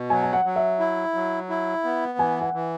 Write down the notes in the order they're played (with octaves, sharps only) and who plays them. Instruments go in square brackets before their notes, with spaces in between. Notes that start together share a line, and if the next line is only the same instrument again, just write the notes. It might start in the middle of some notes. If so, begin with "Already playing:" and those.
Already playing: [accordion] B2
[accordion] F#3 [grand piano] G#5
[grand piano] G#5
F#5
[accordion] F#3
[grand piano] E5
[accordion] E4
F#3
E4
B3
[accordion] E3 [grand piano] G#5
[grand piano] F#5
[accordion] E3